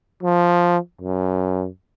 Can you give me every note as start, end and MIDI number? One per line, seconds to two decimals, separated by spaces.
0.23 0.78 53
1.01 1.67 42